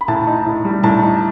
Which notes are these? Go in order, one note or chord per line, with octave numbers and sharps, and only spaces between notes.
B5
A2 A5
D#4
A2
G3
A2 A5
D#4